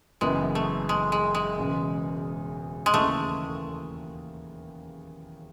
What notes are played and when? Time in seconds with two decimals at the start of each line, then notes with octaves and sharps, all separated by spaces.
0.21 F#1 F#2 E3 G#3 B3
0.55 A3
0.89 G#3
1.12 G#3
1.35 G#3
1.58 E1 E2 C#3
2.86 G#3
2.94 D#2 C#3 E3 A3